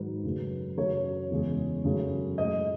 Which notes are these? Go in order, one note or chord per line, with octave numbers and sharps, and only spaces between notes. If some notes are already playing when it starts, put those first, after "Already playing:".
Already playing: G#2 D#3 F#3 B4
F#2 C#3 F#3 A3
F#2 C#3 F#3 A3 C#5
E2 C#3 G#3
F#2 C#3 F#3 A3
A2 G#3 D#5